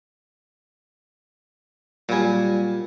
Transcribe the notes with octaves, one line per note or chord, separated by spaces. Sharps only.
A#2 F#3 G3 G#5